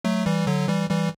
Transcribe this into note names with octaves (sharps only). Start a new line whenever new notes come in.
F#3 A3
E3 G3
D3 F#3
E3 G3
E3 G3